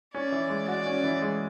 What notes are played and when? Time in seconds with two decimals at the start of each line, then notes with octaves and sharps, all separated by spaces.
0.15 C#4 D5
0.32 E3
0.50 G#3
0.68 F#4 D5
0.86 C#4
1.04 E3
1.22 G#3